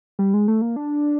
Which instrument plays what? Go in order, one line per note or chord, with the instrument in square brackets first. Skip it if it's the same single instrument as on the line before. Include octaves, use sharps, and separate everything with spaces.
[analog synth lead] G3
G#3
A3
A#3
D4